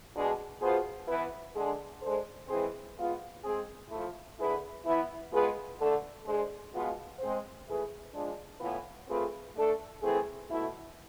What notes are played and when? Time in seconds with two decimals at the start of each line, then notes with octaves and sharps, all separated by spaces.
0.14 B2 G#3 D4 G#4
0.61 B2 B3 F4 G#4 C5
1.08 E3 B3 E4 B4
1.55 D3 G#3 D4 G#4
2.02 G#3 D4 A4 C5
2.49 E3 G#3 C4 G#4 C5
2.97 G#3 B3 F4
3.44 G#3 C4 G#4
3.90 F3 A3 E4
4.38 D3 A3 E4 G#4 B4
4.84 E3 B3 E4
5.32 G#3 B3 F4 G#4 B4
5.79 D3 A3 D4 A4
6.25 G#3 D4 G#4 C5
6.73 B2 G#3 B3 F4
7.20 G#3 C4 G#4 C5
7.66 E3 A3 E4 G#4 B4
8.14 F3 G#3 D4
8.60 A2 E3 B3 F4 B4
9.08 A3 C4 F4 G#4 B4
9.55 A3 D4 A4
10.02 E3 A3 C4 G#4
10.49 B2 A3 E4